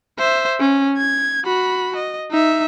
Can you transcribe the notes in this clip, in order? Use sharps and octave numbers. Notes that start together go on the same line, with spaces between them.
C5 E5
C#4
G#6
F#4 B5
D#5
D#4 E5